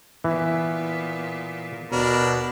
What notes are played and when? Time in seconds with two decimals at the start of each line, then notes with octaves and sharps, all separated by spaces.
0.24 A#2 E3 B3
1.92 D#2 B2 D4 A#4 B5